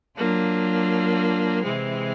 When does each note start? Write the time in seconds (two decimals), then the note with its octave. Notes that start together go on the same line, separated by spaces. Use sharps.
0.17 F#3 A#3 D4 F4
1.63 C3 E3 G#3 C4